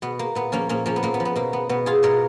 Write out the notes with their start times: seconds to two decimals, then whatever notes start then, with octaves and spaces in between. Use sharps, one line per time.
0.02 B2 B3
0.19 A#3
0.35 A#2 B3
0.52 F3 A#3 C#4
0.69 A#2 A#3 C#4
0.86 F3 A#3 C#4
0.96 B3
1.03 A#2 A#3
1.14 B3
1.20 F3
1.25 B3
1.36 B2 A#3
1.53 B3
1.69 B2 B3
1.86 F4 G#4
2.03 B2 A#4 C#5